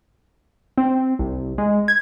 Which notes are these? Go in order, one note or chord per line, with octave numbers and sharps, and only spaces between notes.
C4
C2
G#3
G#6